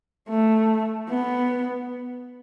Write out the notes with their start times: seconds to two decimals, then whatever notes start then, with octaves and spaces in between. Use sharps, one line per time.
0.30 A3
1.10 B3